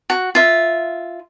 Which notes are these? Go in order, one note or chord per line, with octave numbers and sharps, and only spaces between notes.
F#4
F4 E5